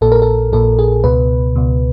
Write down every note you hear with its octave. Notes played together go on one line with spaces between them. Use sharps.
A#1 A#2 A4
A#4
A4
A#1 A#2 A4
G#4
C#2 B2 B4
C#2 B2